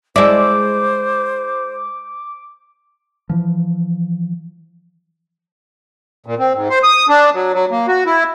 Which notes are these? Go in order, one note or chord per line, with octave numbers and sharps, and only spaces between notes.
G#3 E4 C5 D5 A5 D6
E3 F3
A#2
C4
G#2
C5
D#6
D4
F#3
F#3
A#3
F#4
E4